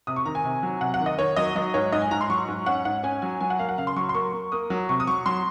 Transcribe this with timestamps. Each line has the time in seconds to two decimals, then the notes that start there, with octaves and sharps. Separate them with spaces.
0.07 C3 D#6
0.16 C#6
0.25 D#3 A#5
0.35 G#5
0.44 C3
0.63 F#3
0.81 C3 F#5
0.94 F#5
1.00 D#3
1.06 D#5
1.18 D#3 C#5
1.36 F#3 D#5
1.55 F#3 D#5
1.74 G#2 C#5
1.92 G#2 D#5
2.02 G#5
2.11 G#2 A#5
2.21 C6
2.30 F#3 C#6
2.48 G#2
2.66 C#4 F#5
2.85 G#2 F#5
3.03 C#4 G#5
3.22 F#3 G#5
3.40 F#3 G#5
3.50 F#5
3.59 A#3 F5
3.69 F#5
3.77 C#3 F5
3.87 C6
3.96 F#3 C#6
4.09 C6
4.15 A#3 C#6
4.33 A#3
4.52 A#3 D#6
4.70 F#3
4.89 C3 C#6
5.00 D#6
5.07 F#3 C#6
5.26 F#3 C6